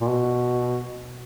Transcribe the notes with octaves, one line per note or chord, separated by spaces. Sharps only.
A#2
B2